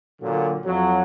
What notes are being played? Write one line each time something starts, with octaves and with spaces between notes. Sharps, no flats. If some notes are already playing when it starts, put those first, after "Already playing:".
A#2 D3 F#3
F2 F#3